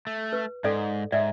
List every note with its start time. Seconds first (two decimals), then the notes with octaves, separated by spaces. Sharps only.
0.07 A3
0.33 B4
0.64 G#2 A4 D5 D#5
1.12 G#2 D5 E5